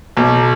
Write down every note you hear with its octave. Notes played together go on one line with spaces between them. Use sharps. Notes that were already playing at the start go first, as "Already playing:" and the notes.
B1